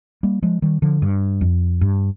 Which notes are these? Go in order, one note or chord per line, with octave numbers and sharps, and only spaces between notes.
G3 A#3
F3 G#3
D#3 G3
D3 F3
G2
F2
G2